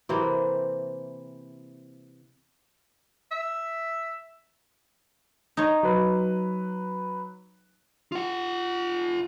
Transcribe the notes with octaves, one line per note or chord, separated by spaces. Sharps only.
C3 E3 A#3 C4
E5
D#4 C#5
F#3 B4
F4 F#5